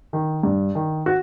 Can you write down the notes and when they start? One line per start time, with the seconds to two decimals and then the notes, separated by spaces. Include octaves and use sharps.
0.13 D#3
0.43 G2
0.75 D#3
1.06 F#4